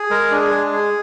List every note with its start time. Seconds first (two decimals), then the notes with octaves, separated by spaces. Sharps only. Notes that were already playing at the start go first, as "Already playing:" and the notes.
Already playing: G#4
0.10 G#3 A#4
0.31 D4
0.41 G#4
0.52 G#3
0.73 G#4